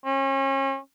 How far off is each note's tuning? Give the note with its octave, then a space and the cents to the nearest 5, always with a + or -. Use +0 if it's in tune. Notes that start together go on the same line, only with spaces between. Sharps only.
C#4 -35